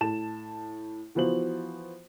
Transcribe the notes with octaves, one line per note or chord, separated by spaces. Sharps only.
A2 A5 E7
E3 F3 B3 F#4 C5 F#7